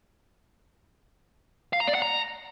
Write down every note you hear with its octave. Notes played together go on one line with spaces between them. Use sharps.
F5
A#5
D5
F#5
A#5